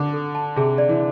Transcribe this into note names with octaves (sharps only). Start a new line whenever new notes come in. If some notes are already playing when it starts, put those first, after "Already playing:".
Already playing: D3 D6
A4
A5
C3 G#4
D5
E3